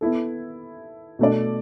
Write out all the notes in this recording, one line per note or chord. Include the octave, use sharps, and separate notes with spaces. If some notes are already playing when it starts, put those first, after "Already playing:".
B3 E4 A4
B2 A3 D4 A4 D5